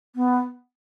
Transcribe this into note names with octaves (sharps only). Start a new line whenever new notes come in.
B3